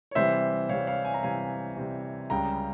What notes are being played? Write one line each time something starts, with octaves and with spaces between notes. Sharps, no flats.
C#5
C3 E3 G3 C5 E5
C3 E3 G3 C#5 F5
C#5 F5
G#5
A#5
C3 E3 G3 F5 G#5
C3 E3 G3
C#2 C#3 G3 G5 A#5